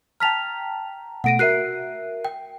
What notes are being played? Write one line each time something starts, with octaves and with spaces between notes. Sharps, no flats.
G5 A5 A#5 F6 B6 F7
B2 A3 F#5 A#6 D7 D#7
F#4 A#4 E5 F#6 C7 D#7
G5